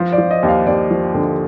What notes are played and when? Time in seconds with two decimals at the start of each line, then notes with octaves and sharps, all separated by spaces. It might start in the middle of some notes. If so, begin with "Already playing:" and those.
Already playing: F3 C5
0.12 D5
0.18 F3
0.31 D#5
0.43 D#2
0.48 F5
0.66 D#2 D5
0.91 F3
1.14 D3